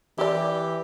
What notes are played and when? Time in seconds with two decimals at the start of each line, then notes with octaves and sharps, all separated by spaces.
0.18 E3 E4 G4 D5